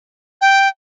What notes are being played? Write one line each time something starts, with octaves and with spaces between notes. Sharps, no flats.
G5